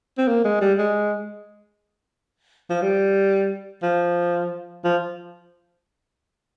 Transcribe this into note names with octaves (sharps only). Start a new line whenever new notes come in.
C4
A#3
G#3
G3
G#3
F3
G3
F3
F3